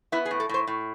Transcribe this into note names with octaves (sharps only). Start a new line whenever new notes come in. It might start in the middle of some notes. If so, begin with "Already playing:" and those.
B3 E4
G#4
A2
A4
A2 C5
A2